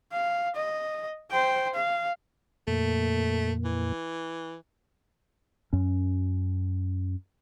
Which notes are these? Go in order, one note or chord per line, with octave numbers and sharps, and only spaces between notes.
F5
D#5
C5 G5
F5
F2 A#2 A3 A#3
E3
F#2 C#4